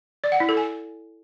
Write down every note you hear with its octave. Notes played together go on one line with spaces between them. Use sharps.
D5
F#5
E4
A4
G#5